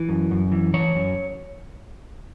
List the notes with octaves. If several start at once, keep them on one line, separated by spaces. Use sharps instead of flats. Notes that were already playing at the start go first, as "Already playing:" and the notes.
Already playing: E3
F#2
F#2
E3
E3 C#5
F#2